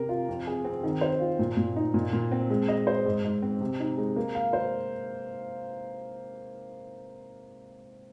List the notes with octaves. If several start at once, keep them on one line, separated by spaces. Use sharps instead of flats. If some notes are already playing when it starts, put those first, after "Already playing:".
Already playing: C3 A#4
F4
F2
G#4
C4
D#3
C5
F4
A#2
A#2
D#4
A#2
A#2
C4
G#3
D#5
C5
G#2
G#2
C4
C3
D#4
G#3
A#3
F5
C5